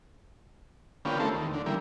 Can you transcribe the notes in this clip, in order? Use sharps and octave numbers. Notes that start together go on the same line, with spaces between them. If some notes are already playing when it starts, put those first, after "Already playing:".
D3 A#3 B3 C#4 F4 G4
A3 E4 A4 A#4 C5
D#2
D3
E3 G3 A#3